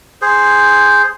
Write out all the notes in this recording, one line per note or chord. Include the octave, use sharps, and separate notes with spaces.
G#4 C5